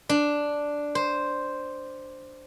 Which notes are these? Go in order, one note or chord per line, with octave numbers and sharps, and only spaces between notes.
D4
C5